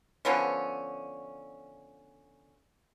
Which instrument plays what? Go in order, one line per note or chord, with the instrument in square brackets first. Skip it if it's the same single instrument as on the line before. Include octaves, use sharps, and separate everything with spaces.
[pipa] D3 F3 B3 C#4